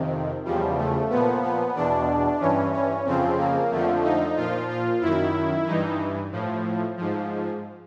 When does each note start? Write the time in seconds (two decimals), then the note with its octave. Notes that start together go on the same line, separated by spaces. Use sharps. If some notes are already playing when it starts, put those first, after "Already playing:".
Already playing: F2 C3 D#3
0.45 E2 C#3 F3 G3
0.77 A3
1.10 A#2 F3 B3
1.42 B3
1.75 E2 B2 D4
2.40 G2 E3 C#4
2.73 C#4
3.06 F2 C#3 F3 C4
3.38 A#3
3.71 F2 D3 F3 A3
4.03 D#4
4.36 A#2 F3 F4
4.69 F4
5.01 F#2 D#3 E4
5.66 G2 E3 D#4
6.32 A2 F3
6.97 G#2 F3